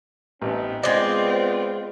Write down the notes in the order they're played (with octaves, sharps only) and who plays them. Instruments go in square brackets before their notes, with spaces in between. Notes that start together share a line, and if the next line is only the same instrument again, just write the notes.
[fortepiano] A1 [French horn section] B3 C4 D#4
[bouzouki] G#3 D5 [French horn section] B3 F4 [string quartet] C4 [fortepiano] D#5